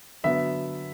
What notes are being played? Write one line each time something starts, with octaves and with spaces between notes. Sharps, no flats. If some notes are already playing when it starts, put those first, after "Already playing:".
D3 F#3 B3 E5